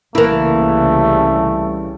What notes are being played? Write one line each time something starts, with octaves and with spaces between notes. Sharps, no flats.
C2 C#3 E3 G3 A3 A#3 E4 A#4